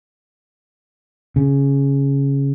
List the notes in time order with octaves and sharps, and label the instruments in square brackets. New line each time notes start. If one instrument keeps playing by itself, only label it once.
[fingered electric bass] C#3